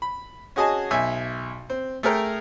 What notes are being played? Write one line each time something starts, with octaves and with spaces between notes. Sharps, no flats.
B5
C#4 F#4 G#4 D#5 G#5 A5
B1 E5 G#5
C4
A3 G#4 A#4 G5